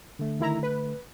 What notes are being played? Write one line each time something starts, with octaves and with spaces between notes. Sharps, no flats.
D3 A3
D#3 E4 A#5
B4